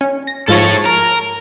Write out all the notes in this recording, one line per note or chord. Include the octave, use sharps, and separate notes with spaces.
C#4
A#6
G#2 F3 A4 C#5
A#4